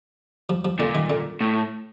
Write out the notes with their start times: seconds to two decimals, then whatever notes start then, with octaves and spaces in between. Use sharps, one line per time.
0.49 F3
0.65 F3
0.79 A#2 D3
0.95 D#3
1.10 D3
1.41 A2